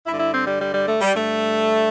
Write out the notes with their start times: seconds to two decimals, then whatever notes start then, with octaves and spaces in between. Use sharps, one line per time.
0.06 G2 D3 E4
0.19 E4
0.33 C4
0.46 G3
0.60 G3
0.74 G3
0.88 A3
1.01 G3
1.14 G2 D3 A3